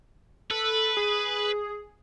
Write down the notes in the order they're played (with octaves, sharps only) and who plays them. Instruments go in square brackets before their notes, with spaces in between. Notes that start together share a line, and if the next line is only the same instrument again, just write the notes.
[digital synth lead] A4 [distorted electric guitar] B4
[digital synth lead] G#4